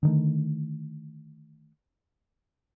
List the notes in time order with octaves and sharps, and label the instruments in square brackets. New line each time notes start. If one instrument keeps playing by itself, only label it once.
[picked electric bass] D3 D#3 A3